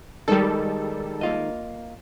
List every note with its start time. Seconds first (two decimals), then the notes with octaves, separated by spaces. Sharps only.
0.28 D#3 G3 G#3 D#4 A4
1.21 A#3 F4 D#5